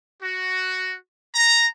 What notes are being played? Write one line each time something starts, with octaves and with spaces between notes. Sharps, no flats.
F#4
A#5